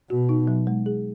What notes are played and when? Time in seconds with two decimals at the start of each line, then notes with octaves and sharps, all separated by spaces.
0.10 B2 F#4
0.29 D#4
0.47 F#3
0.67 G#3
0.86 G#4